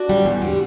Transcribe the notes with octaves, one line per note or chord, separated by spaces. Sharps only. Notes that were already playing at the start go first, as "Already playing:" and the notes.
Already playing: D4 F#4
D3 G3
E2
D3 G3